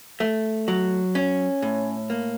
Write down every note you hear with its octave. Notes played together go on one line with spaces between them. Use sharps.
A3
F#3
C#4
A2
A#3